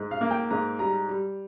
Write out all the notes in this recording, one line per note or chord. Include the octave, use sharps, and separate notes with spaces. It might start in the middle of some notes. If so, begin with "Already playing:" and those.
Already playing: G#2
F5
A#3
G5
G#2 A#5
G3 A#5
G3